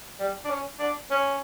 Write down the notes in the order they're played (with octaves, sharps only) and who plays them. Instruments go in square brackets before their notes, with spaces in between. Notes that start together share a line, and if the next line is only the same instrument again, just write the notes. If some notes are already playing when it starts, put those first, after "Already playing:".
[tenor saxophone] G3
D4
C#4
D4
C#4